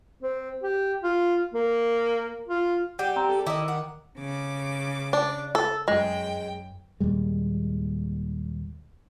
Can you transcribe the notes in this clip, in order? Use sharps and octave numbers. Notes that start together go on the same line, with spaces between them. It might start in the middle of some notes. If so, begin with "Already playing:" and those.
C4
G4
F4
A#3
F4
G3 G4 F#5 G5
C4 A#5
A4
D#3 E4 D#5 D6
F#5
C#3 D6
D4
A4
F#2 G#3 G5
D#2 A#2 G3 G#3